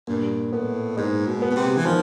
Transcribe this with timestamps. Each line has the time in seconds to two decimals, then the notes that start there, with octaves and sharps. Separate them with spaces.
0.07 G2 A#2
0.52 A2 B3
0.97 G#2 G#3
1.27 B2
1.42 B3
1.50 B2
1.56 C3
1.77 E3
1.85 D#3 F3